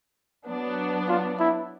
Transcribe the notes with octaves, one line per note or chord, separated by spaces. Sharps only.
F#3 B3 D4
F4
E4